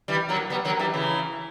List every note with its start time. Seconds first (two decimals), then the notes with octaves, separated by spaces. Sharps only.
0.08 E3 G3
0.29 F#3 A#3
0.50 G3 B3
0.65 F#3 A#3
0.79 E3 G3
0.94 C#3 E3